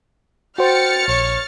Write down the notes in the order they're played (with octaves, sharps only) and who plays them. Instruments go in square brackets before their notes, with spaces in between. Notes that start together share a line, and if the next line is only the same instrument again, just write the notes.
[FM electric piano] F#4 C5 [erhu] G5 [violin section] F6 A6 C#7
[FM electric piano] A#1 [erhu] C#5